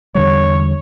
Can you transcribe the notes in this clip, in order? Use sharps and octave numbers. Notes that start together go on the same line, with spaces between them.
E2 D3 G3 C#5